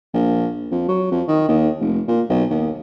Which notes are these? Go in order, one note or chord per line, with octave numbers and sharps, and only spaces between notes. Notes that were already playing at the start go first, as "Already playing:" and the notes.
A#1
F2
F#3
F2
D#3
D#2
F1
A#2
B1
D#2